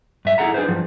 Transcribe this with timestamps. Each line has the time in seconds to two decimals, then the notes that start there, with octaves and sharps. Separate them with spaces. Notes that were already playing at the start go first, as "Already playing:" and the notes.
0.25 G2 E5
0.38 E4 F4 G#4 A4 F#5 A#5
0.54 D4 G#4 B4 C5
0.68 G2 F3